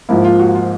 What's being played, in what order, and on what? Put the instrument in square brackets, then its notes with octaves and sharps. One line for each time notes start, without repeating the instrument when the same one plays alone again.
[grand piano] G#2 F3 A#3 [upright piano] E4
[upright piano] F4
F#4
F4